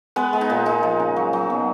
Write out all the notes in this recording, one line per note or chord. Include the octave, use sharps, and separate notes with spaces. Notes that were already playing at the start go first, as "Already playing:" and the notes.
G#3 B3 B4
G#3
D#4
A#2
G#3 D#4
F3
C#3
F#3
F#3
B2